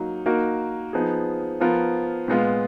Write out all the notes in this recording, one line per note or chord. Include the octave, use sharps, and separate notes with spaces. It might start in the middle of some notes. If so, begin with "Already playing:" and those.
Already playing: F#3 A#3 D#4
A#3 D#4 F#4 A#4
F3 B3 D#4 G#4
F3 B3 F4 A#4
A#2 G#3 B3 F4 B4